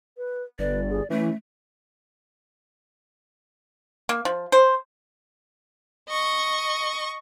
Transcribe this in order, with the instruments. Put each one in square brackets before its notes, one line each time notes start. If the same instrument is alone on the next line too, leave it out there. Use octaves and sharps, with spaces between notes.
[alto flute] B4
[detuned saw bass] G1 [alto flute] B4 [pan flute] D5
[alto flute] G#4
[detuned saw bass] E3 [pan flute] A3 [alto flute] C#4
[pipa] A#3
F3
C5
[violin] D#5 C#6